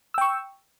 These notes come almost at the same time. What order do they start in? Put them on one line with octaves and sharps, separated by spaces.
E6 G5 C#6